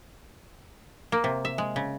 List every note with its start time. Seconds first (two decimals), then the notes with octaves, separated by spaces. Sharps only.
1.12 A#3
1.24 C3
1.45 E5
1.58 G#3
1.76 C#3